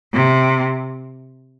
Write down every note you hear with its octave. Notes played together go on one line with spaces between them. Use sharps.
C3